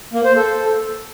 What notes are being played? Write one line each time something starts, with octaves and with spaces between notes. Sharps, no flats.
A#3
C5
A4